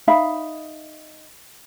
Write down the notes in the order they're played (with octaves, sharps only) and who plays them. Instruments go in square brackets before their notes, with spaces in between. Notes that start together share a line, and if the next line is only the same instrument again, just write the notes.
[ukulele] D#4 E5 F5 B5